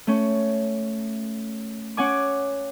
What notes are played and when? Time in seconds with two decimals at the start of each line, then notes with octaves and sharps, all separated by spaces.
0.07 A3 C#4
1.97 C#4 F#5 G#5 D6